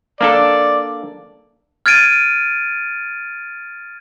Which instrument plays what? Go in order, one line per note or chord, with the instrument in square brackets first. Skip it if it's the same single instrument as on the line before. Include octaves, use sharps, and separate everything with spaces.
[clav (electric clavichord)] A#3 D4 A4 [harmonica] D5
[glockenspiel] F6 G#6 A6 D7 D#7